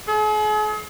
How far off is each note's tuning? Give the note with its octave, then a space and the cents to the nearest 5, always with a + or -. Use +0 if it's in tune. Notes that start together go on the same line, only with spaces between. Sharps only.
G#4 +40